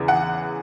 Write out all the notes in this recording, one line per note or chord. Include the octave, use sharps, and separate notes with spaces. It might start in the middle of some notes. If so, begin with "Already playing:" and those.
Already playing: E2 C#3 E3
F#5